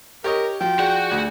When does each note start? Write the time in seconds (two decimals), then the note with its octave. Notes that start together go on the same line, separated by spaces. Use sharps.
0.24 G4 A#4 C#5 D#5
0.61 F3 F#4 G5
0.79 F#4 G#4 D5 F#5 G6
1.11 D2